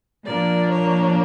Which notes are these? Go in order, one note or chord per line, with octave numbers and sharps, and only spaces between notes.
A#2 F3 A#3 D4 D5
C#5